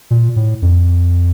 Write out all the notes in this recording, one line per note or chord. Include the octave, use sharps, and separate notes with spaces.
A#2
A2
F2